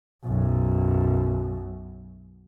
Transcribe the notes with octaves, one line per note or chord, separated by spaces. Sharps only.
B1 F#2